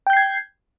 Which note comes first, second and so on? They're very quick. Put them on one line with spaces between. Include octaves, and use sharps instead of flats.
G5 G6 C7 G#6